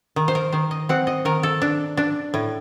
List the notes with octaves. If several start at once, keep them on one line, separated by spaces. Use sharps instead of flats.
D#3
C5
A#4
D#3 C5
D#5
C4 F#5
D#5
D#3 A#4
A4
D4
D4
A2